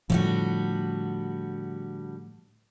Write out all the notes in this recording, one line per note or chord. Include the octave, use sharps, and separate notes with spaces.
A2 D3 F3 G3 F#4